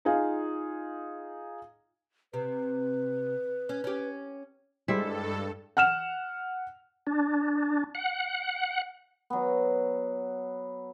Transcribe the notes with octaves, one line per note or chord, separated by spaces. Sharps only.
D#4 F4 G#4 F5
C3 B4
C#4
C#4 G4
G2 G3 G#3 E4 A4 C5 E5
F#5 F6 E7
D4
F#5
F#3 B3